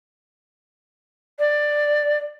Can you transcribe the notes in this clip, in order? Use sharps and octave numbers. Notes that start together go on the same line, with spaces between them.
D5